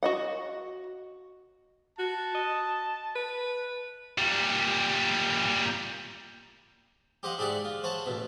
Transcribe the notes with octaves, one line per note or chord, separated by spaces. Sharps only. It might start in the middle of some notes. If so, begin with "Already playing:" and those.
F#4 D#5 F#5
F#4 A5
D#5
B4
A#2 G3
G4 C5 D#5 F5 F#5
G#2 G4 G#4 D5 E5 F#5
F4
C5 C#5 F#5 A5
A1 B2